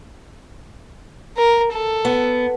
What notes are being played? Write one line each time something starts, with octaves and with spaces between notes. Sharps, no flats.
A#4
A4
B3